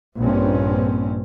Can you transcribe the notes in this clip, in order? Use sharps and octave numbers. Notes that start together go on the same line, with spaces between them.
A#1 G2 C4 C#4